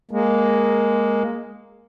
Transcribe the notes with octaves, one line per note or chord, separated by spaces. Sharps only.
G#3 A#3